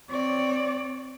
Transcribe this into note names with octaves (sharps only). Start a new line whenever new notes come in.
C4 C#5 D5